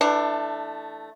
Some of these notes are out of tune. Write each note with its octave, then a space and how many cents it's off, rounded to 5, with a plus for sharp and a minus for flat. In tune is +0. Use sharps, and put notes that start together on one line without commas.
E3 +0 A3 +0 D4 +20